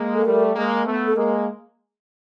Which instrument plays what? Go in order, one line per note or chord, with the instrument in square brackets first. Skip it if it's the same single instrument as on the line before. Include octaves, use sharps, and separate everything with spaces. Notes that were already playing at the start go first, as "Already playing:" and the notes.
Already playing: [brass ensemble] G#3 A#3
[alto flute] A4
[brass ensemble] G3 A3 [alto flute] A#4
[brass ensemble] G#3 A#3
A3 B3
[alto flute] A4
[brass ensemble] G#3 A#3 [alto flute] A#4